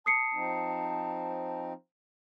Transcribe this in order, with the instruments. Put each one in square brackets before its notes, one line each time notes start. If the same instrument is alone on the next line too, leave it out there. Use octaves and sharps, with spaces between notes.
[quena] A5 [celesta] D#6 C7 C#7
[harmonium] F3 C4 D#4